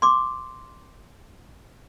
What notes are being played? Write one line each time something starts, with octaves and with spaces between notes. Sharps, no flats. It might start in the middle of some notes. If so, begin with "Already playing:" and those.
C6 D6